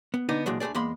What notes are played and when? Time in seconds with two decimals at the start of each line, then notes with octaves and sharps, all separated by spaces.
0.14 B3
0.29 D3 B3 D4 D#4
0.46 A#2 E3 F#3 G#3 D4
0.60 D2 D3 A3 G#4 D5
0.75 E2 G#3 A#3 B5 C6